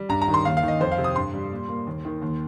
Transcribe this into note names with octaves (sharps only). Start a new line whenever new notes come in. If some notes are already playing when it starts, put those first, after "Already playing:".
Already playing: G3
G2 A#5
A#5
D#3
C6
D#2 F5
F5
D#3
D#5
F2 C5
F5
C3
D#6
G2 C6
G3
A#2
A#3
D#2
D#3
D#2